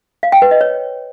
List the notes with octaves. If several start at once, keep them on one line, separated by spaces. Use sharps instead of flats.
F5
G5
B4
D#5
C#5